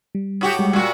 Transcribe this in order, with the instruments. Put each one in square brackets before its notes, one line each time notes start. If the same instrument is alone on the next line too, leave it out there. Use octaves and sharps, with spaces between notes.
[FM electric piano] G3
[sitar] A2 F#4 G4
[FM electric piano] G3 G#3
[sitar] A#2 F#4